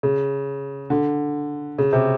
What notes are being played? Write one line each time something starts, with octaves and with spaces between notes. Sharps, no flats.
C#3
D3
C#3
C3